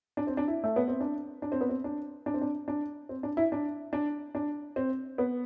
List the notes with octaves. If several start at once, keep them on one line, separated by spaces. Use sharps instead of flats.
D4
C4
D4
E4
A3
B3
C4
D4
D4
C4
B3
C4
D4
D4
C4
D4
D4
C4
D4
E4
D4
D4
D4
C4
B3